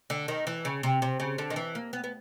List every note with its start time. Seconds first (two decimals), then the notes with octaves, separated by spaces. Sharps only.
0.10 D3
0.28 D#3
0.47 E3
0.65 C#3
0.83 C3
1.02 C3
1.20 C#3
1.38 D3
1.50 D#3
1.56 E3
1.75 A#3
1.93 B3
2.04 B3